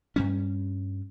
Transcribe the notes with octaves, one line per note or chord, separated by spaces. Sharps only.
G2 G3 C#4